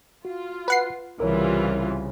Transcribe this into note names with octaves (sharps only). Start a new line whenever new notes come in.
F4 F#4
B4 F#5 C7
C2 C#3 E3 G3 F4 A#4 C#5